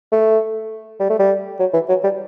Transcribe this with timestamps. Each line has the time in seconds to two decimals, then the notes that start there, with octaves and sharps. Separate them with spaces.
0.12 A3
1.00 G3
1.10 A3
1.19 G3
1.60 F#3
1.74 E3
1.89 F#3
2.04 G3